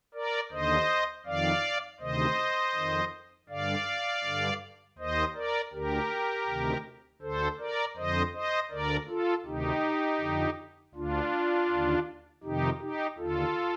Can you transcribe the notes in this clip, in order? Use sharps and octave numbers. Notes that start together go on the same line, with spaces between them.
A#4 D5
D#2 D3 C5 D#5
F2 D#3 D5 F5
D2 C3 D#3 C5 D#5
F2 D#3
G2 D3 D5 F5
G2 D3
D#2 D#3 C5 D#5
A#4 D5
D2 D3 G4 A#4
D2 C3 D#3
D2 D3 A4 C5
A#4 D5
F2 D3 C5 D#5
C5 D#5
D2 D3 A#4 D5
F4 A4
D2 C3 D#3 D#4 G4
F2 D3
D2 D3 D4 F4
D#2 D3
F2 C3 D#3 D#4 G4
D#4 G4
D#2 D3 F4 A4